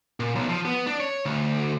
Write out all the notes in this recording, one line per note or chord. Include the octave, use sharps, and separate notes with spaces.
A#2
B1
F3
B3
D4
C#5
D2